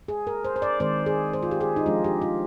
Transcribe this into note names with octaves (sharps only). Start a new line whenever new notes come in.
G#4
A#4
C5
C5
D5
D#3 G#3 C4 C5
G#4
C5
F4
G4
G#4
D#4
F3 G#3 D4 F4
G4
F4